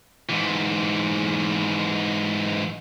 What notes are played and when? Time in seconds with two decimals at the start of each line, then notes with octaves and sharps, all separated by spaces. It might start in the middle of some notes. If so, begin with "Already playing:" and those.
0.29 G#2 E3